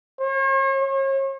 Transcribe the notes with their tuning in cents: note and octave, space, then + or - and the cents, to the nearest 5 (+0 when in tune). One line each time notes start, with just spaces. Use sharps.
C#5 -45
C#5 -40